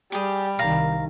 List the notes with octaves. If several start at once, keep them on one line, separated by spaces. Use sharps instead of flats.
G3 G4 G#4
C2 D#3 F5 A#5